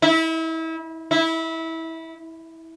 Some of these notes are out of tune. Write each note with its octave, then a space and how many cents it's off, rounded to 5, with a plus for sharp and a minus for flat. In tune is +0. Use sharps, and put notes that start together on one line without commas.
E4 -30
E4 -20